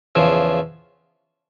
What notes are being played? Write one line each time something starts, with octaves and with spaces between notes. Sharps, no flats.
E2 C#3 F3